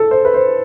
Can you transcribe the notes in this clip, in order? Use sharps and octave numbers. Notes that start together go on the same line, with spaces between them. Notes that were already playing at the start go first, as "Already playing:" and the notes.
Already playing: A4
C5
B4
C5